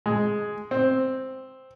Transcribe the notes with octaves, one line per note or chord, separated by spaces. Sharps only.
G#3
C4